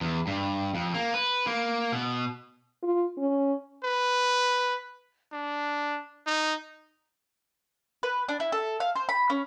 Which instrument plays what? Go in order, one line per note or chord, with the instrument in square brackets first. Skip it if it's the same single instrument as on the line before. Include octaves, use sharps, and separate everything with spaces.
[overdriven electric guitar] E2
G2
F2
A#3
B4
A#3
B2
[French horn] F4
C#4
[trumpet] B4
D4
D#4
[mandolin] B4
D4
E4
A4
F5
C5
B5
C#4